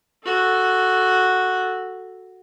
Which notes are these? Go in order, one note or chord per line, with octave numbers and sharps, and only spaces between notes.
F#4 A4